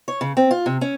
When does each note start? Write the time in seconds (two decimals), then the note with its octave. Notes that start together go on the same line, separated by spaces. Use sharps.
0.08 C#5
0.21 C#3
0.37 C4
0.51 F4
0.66 C3
0.81 C#4